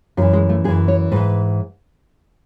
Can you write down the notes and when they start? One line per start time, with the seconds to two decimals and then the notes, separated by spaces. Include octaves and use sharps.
0.17 F#2 F#3
0.22 E3
0.33 G#3
0.49 A3
0.64 F#2 G#4
0.68 E3
0.88 C#5
1.11 G#2 E3 B4